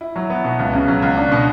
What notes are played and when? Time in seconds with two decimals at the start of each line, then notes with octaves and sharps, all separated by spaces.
0.01 E4
0.16 F#3
0.30 B3
0.44 B2
0.59 C#2
0.73 C#3
0.88 F#3
1.02 C#2
1.17 D4
1.32 B2